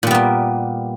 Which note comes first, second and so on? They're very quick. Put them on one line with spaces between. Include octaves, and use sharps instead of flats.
A#2 G3 B3 A#3